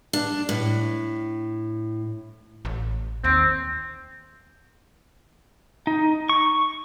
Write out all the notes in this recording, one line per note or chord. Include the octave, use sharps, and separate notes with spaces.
D4
A2
A1
D#2 C4
D#4
C#6